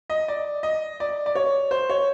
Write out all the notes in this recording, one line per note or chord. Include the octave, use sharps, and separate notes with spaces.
D#5
D5
D#5
D5
D5
C#5
C5
C#5